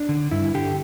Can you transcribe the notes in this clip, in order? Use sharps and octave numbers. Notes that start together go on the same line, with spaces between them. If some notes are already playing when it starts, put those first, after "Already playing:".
Already playing: D4
D3
G2 E4
D3 G4